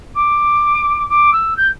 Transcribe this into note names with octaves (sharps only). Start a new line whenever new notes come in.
D6
D6
E6
G6